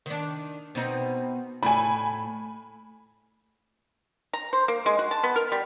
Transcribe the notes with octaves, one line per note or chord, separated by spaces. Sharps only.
D#3 D4
B2 C4 D#4
A2 G#5 B5
A#5
C5
A#3
G#3
F#4
A5
B3
A#4
G3